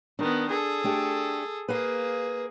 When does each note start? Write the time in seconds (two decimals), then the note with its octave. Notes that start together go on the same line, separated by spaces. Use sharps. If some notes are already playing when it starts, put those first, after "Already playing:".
0.19 D#3 B3 D4
0.50 G#4 A4
0.84 A3 D4 G4
1.69 A#3 G#4 B4 F5